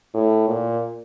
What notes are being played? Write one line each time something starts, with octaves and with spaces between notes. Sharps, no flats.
A2
A#2